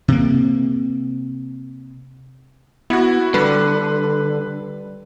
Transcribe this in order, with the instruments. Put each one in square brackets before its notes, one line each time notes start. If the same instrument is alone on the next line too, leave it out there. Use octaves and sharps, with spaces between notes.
[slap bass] C3 A#3
[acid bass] B3 [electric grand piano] E4 F#4
[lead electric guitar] D3 [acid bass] G3 [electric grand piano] B4